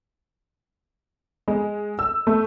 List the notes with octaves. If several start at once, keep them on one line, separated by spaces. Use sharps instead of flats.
G#3
E6
A3